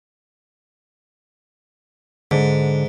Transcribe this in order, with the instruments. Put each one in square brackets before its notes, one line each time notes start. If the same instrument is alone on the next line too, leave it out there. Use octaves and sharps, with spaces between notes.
[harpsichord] G#2 [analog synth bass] D3